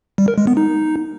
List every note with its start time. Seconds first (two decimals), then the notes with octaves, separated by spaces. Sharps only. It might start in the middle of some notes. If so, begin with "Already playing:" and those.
0.18 G3
0.28 A#4
0.38 G#3
0.47 B3
0.57 D#4